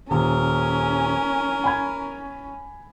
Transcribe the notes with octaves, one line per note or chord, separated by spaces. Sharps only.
D#1 C#4 A#4
G#5 B5 G#6